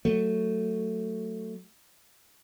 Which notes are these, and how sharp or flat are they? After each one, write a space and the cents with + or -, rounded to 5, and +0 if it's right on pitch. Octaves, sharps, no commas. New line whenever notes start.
F#3 +0 A3 +10